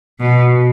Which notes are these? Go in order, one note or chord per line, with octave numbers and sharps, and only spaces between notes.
B2